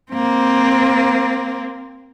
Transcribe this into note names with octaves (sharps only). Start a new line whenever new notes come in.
A#3 C4